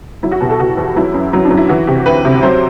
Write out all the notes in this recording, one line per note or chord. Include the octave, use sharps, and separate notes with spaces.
F#3 E4
F#4
B2 G4
A4
B2 F#4
E2
F#3 E4
F#2
F#3
D4
F#3
E4
E3 F#4
C3 G4
D2 B4
C3
F#3 C5